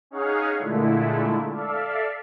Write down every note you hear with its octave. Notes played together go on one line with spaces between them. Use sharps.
C#4 D#4 G#4 C#5 F5 F#5
A#2 D3 G#3 A3 E4
A4 D5 E5 F5